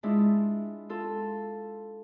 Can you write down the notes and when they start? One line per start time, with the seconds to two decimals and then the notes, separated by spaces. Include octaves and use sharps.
0.03 G#3 D4 E4 F4
0.90 F4 A4 F5